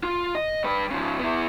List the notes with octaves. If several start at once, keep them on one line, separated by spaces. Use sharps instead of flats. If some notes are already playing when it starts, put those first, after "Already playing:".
F4
D#5
G2 B4
C#3 F3
B3 E4